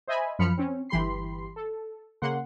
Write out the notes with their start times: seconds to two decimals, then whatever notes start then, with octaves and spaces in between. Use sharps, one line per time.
0.08 C5 D#5 E5 G#5 B5
0.39 F#2 F3 B5 F6 C#7
0.57 C4 C#4
0.89 G1 E3 G4 B5 C6 C7
1.56 A4
2.22 C#3 A#3 F#5 C6